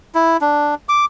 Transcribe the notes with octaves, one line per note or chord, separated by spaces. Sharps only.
E4
D4
D6